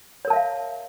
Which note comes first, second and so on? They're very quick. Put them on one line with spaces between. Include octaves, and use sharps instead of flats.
C#5 A#4 A5 E5 F5